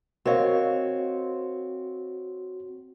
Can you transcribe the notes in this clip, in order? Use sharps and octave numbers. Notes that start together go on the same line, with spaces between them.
C4 F#4 A#4 C#5 D#5 F5